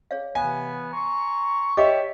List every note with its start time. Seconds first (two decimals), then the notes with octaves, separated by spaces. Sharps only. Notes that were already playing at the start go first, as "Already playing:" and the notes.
0.11 G#4 C#5 F5
0.35 C3 E3 B3 F5 G#5
0.93 A#5 C6 C#6
1.77 G4 C#5 D#5 E5 D6